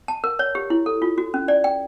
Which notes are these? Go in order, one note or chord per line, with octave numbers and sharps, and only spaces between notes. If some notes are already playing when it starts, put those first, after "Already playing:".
A5
A#4
C#5
G4
E4
A4
F4
F#4
C#4
D5
G5